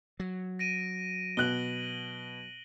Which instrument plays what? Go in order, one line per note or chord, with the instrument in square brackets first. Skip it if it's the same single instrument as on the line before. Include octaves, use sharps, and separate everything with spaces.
[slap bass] F#3
[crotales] A#6 D7 D#7
[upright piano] B2 F#6 [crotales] F#7 G7